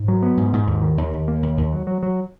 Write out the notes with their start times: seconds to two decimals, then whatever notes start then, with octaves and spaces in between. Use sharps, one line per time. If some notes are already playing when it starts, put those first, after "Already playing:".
Already playing: G#2
0.08 F#3
0.23 B3
0.37 G#2
0.53 G#2
0.67 D#2
0.82 D#3
0.97 D#2
1.13 D#2
1.28 A#3
1.43 D#2
1.57 D#2
1.73 F#3
1.87 F#3
2.03 F#3